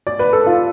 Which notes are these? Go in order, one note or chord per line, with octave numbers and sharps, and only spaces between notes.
D5
B4
A4
F4